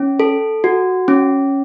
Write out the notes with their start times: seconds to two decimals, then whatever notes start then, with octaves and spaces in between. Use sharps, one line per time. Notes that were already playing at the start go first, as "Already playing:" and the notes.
Already playing: C#4
0.20 A4
0.64 F#4
1.08 C#4